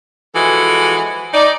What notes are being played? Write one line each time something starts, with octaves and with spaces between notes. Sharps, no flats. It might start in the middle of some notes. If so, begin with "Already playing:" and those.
E3 F3 G#3 F#4 A4
D#4 D5